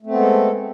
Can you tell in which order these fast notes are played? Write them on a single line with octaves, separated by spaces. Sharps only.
A3 C4 B3 G#3 A4